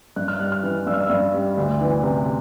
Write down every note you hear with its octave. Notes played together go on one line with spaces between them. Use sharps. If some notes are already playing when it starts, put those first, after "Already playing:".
G2 F#6
F6
G3 F#6
F6
E3
G2 E6
F6
E6
G2
G3
D2
E3
C3